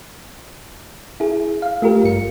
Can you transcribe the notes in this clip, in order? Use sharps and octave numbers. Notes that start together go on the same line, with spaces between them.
E4 G#4
F5
A3 F4 G4 A#4
G#1 G2 C#7